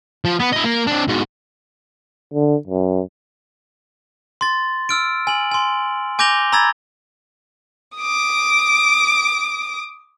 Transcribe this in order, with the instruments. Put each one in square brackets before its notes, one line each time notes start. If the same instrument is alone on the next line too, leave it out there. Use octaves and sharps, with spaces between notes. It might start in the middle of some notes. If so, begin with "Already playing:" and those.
[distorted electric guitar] F3
B3
E4 D#5
A#3 A#4
C4 D4
G#2 B2
[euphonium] D3
F#2
[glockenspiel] C6 A6
E6 F6 D7
G#5 F#7
G#5 C6
G#5 D6 G6 A#6 F7 G7
A#5 B5 E6 G#6 A6
[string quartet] D6 D#6